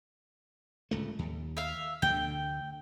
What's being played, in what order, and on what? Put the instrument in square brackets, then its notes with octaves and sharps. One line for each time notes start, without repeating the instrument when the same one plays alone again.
[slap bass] D1 C#2 A3
D#2
[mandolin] E5 F5
[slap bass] D2 D3 [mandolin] G5